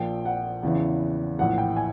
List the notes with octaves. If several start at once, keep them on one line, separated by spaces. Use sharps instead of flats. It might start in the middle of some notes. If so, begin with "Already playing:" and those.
Already playing: A#1 A#2 F3 G5
F#5
E2 C#3 E3
A#1 A2 E3 F#5
G5
G#5